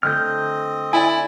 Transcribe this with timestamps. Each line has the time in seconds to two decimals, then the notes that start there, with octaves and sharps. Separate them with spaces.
0.03 D3 A3 C4 F4 D#5 F6 G6
0.93 E4 D5 G#5